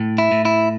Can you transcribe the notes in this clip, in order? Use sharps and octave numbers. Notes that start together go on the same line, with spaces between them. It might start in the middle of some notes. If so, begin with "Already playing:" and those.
Already playing: A2
E4
A2
E4